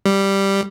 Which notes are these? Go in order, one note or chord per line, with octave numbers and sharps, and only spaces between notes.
G3